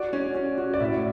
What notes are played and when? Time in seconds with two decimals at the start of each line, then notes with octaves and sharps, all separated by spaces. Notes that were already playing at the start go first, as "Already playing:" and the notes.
Already playing: F#4 D5
0.13 C#4
0.34 C#4
0.58 F#4
0.74 D5
0.80 A2 E5